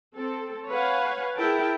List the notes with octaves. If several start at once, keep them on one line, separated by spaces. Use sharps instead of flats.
C4 A4
B4 C#5 F5 F#5 G#5
E4 G#4 A#4 G5 A5